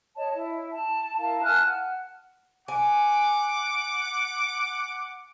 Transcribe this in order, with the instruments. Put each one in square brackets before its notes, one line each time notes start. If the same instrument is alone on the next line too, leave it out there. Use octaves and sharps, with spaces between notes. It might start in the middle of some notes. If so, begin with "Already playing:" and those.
[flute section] C#5 D#5 A5
E4
A5
E4 A#4 F5 A5
G#5 A5 F6 F#6
F#5
[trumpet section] F#5 D6 [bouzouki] G#5